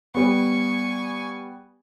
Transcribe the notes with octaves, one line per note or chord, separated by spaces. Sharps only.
G3 B3 G#5 C#6